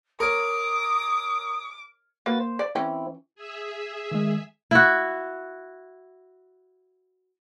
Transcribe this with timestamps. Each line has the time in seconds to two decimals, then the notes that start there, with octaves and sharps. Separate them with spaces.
0.20 A#4 C#5 D6 D#6
2.26 A#3 F#4 B4 A6
2.40 C5
2.59 D5
2.75 E3 C4 C#4 E4 G5
3.35 G#4 E5
4.11 D#3 G#3
4.71 E4 F#4